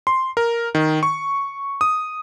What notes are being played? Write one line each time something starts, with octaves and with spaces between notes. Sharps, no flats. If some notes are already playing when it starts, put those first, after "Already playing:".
C6
A#4
D#3
C#6
D#6